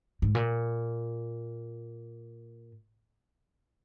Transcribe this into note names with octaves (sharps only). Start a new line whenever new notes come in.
G#2
A#2